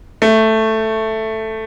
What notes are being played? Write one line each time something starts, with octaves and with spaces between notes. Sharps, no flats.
A3